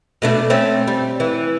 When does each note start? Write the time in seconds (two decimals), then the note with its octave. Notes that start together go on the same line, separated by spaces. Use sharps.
0.22 B2 A3 D4
0.50 A3 C4 C#4
0.88 G3
1.20 E3